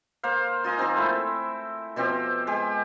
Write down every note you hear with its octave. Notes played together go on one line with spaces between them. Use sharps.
A#3 C5 F5
F4 D#5 G#5 A#5
F3 A#3 C4 D#4
A3 E4
B2 F3 C4 G4
G#3 G4